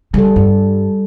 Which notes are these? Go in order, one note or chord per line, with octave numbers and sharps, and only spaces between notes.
C#3 G3 A4
G2